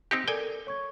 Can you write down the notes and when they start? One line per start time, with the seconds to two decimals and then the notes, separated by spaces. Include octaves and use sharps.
0.11 C4 D#4 G4
0.28 A4 A#4 D5 G5 G#5
0.67 C#5 C#6 G#6